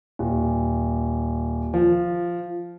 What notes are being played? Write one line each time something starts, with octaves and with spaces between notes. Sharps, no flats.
D#1
F3